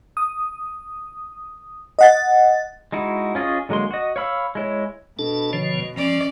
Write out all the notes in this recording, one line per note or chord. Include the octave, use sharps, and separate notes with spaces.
D#6
D#5 F#5 A6
G#3 D#4 E4 F#4
C#4 F4 G#4 C#5 D#5
D3 F#3 G#3 A#3 C6
F#4 D#5
C#5 F5 B5 E6
G#3 E4 C#5
B2 D4 A4 A5
D3 F3 C#5
F3 C#4 D5